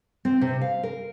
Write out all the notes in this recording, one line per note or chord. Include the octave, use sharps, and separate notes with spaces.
C4
C3
F5
A#4